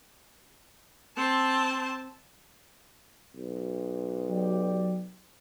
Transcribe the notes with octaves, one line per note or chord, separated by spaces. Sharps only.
C4 A5
B1
F#3 G4 D5